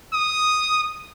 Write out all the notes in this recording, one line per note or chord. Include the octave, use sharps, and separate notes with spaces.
D#6